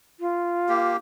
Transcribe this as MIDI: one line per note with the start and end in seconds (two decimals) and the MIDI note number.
0.20 0.92 65
0.69 0.97 58
0.69 0.97 67